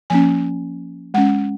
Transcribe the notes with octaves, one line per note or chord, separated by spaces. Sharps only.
F3 A#3 C#4 G#5
G#3 C#4 F#5